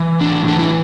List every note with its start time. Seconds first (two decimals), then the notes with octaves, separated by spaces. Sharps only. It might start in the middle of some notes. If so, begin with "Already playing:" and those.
Already playing: E3
0.20 A2 D4
0.48 E3 D4
0.59 E4